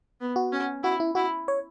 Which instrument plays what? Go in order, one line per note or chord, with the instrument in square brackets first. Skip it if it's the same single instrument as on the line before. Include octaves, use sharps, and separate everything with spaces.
[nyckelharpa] B3
[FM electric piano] F#4
[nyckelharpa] C#4
[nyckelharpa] E4 [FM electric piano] F#4
[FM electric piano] E4
[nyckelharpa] E4 [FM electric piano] F#4
[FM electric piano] C#5